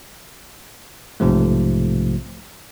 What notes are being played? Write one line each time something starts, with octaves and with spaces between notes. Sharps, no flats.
B1 G#2 C3 F3 A3